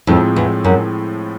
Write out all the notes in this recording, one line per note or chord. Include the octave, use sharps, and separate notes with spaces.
F2 A2 F3 G#3 C4
E2
F#2